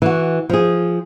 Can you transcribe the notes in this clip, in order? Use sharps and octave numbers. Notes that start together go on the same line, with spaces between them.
E3 F#4
F3 G#4